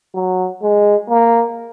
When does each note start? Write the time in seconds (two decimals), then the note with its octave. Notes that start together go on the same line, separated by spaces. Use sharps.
0.15 F#3
0.62 G#3
1.10 A#3